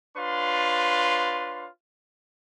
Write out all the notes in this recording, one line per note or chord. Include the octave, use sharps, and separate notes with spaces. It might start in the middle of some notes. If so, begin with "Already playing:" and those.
D4 F4 B4 C#5 F5 C6